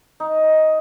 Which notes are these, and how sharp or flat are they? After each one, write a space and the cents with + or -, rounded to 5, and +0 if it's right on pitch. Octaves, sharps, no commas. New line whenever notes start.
D#4 +10